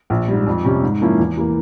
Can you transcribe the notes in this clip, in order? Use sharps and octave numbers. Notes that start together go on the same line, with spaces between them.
A#1
G#2 G3
F2
C3 G3 C#4
G#2
F3 A#3 C#4 E4
E2
E3 A#3